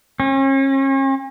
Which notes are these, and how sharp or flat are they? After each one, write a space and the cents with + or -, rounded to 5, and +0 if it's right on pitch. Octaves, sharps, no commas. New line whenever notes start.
C#4 -40